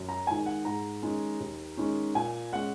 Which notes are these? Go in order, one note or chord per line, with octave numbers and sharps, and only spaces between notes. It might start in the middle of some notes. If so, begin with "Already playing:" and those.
Already playing: F#2
A#5
D#3 G#3 G#5
F#5
G#2 A#5
D#3 G#3 C#4
D#2
D#3 G#3 C#4
A#2 G#5
G#3 C#4 F#5